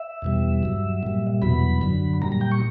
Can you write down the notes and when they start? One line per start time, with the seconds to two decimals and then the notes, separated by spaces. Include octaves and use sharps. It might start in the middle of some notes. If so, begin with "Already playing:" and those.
Already playing: E5
0.22 E2 B2 G3
0.63 G2 F#3
1.03 A#2 G3
1.42 E2 B2 F#3 B5
1.81 F#2 D3 F#3
2.22 A#2 G3 A#5
2.32 A#5
2.41 G5
2.52 C#6